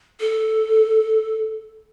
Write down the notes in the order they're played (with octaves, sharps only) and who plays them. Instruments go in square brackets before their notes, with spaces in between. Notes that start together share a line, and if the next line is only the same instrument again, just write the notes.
[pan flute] A4